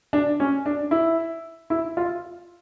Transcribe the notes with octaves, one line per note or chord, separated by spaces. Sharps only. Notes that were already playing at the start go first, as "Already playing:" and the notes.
D4
C#4
D4
E4
E4
F4